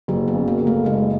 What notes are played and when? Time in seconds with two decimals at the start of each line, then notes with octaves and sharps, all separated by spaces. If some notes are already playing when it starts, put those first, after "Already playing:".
0.08 F#1 F#3
0.28 B3
0.35 C#3
0.48 A#3
0.61 F#1
0.67 A3
0.86 F#1 G#3